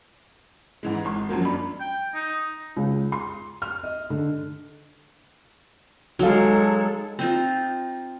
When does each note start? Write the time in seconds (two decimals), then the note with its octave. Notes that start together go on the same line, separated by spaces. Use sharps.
0.83 G#2 E3 G#3
1.05 G#1 C6
1.29 F#2 F3 F#3 A#3
1.45 F#2 D4 B5
1.80 G5
2.14 D#4
2.76 C#2
3.12 C6
3.62 F6
3.83 D#5
4.10 D3
6.19 F#3 G#3 D#4 A4 F5
7.19 C4 D#4 F4